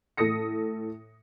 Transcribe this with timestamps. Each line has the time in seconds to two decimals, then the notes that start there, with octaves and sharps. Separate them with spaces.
0.17 A2 A4 D#6 A#6 C#7